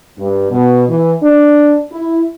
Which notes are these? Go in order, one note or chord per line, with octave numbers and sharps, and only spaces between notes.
G2
B2
E3
D4
E4